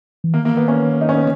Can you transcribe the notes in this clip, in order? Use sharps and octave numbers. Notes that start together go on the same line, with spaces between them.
E3
D#3 A#3
A#3
B3
C#4
D#4
C#4
B3